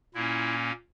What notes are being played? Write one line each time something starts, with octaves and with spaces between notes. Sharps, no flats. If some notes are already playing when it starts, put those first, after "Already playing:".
A#2 A#3 C#4 E4